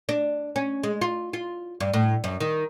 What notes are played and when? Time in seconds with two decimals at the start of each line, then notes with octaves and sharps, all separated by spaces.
0.09 D4
0.56 C#4
0.83 G#3
1.01 F4
1.33 F4
1.80 G2
1.93 A2
2.24 F#2
2.40 D#3